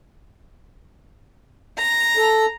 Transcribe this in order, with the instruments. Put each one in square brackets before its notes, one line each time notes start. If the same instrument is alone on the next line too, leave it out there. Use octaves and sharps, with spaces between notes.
[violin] A#5
[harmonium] A4